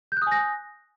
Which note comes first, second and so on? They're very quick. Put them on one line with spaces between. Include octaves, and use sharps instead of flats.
G6 F#6 D#6 G#5 A#6